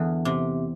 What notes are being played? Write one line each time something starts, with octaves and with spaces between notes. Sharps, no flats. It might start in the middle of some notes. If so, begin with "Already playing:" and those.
Already playing: E2 D3
C3